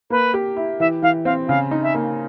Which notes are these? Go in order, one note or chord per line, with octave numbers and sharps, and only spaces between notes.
A#3 B4
G4
E4
E3 E5
E3 F5
C4 F5
C#3 F5
D#4
E5
A#3